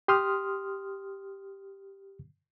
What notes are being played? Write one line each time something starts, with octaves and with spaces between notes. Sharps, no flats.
G4 C6 D#6 F6